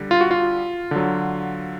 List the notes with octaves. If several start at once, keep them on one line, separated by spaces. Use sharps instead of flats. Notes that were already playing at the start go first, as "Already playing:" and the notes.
Already playing: D3 G3
F4
F#4
F4
D3 F#3